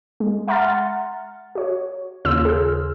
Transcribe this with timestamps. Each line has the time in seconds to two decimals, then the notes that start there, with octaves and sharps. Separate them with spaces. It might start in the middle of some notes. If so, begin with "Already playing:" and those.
0.20 G#3
0.48 E5 F#5 A#5 C6 F6 A6
0.66 F#5
1.55 F#4 C#5
2.25 D#2 C#3 F4 C#5 C6 E6
2.45 G#4 F6